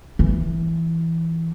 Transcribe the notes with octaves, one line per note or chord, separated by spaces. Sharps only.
E3